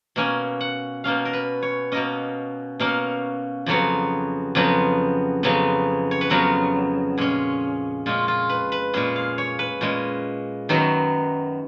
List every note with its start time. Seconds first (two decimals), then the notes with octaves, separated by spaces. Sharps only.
0.16 B2 A#3 C#4 G#5
0.61 F#5
1.04 B2 A#3 C#4 F5
1.25 A#4
1.33 B4
1.62 C#5
1.92 B2 A#3 C#4 D#5
2.80 B2 A#3 C#4 F5
3.66 F2 C#3 F#3 B3 C#5
4.55 F2 C#3 F#3 B3
5.43 F2 C#3 F#3 B3
6.11 C#5
6.21 B4
6.30 F2 C#3 F#3 B3 A#4
7.18 A#2 G#3 C#4 G#4
8.06 A#2 G#3 C#4 F4
8.28 F4
8.49 B4
8.72 B4
8.94 A#2 G#3 C#4 G#4
9.16 F5
9.38 C#5
9.59 B4
9.81 A#2 G#3 C#4
10.69 F#2 D#3 F#3 B3